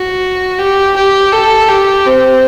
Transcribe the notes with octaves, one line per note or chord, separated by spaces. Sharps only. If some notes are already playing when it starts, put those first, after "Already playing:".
Already playing: F#4
G4
G4
A4
G4
C4